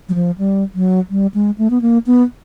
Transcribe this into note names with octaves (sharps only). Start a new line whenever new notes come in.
F#3
F3
G3
F#3
G3
G#3
A3
B3
A#3
B3